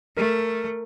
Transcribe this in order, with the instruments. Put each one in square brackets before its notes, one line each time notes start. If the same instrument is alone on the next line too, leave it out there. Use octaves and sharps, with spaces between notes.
[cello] A3 [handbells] A#4